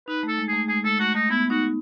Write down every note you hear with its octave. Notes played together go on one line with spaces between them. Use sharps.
D#4 B4
A3 A4
G#3
A3 G#4
G#3 G#4
G#3 A4
A3 F#4
A3 D#4
B3 E4
D#4 F#4